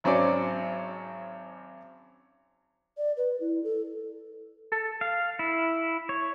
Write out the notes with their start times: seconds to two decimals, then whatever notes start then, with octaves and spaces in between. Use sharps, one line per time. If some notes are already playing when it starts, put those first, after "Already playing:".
0.04 G#1 F#3 C#4 C5 D5
2.97 D5
3.17 B4
3.40 E4
3.64 A4
4.72 A4
5.01 F5
5.39 E4
6.09 C#5